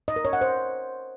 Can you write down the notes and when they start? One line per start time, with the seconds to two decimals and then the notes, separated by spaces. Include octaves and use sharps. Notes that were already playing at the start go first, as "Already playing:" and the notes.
0.08 D#5
0.16 A#4
0.25 C#5
0.33 F#5
0.41 C5